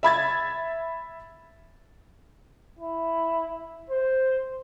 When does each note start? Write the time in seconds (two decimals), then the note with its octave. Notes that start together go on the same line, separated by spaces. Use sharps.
0.03 E5 B5 G#6 A6
2.79 E4
3.90 C5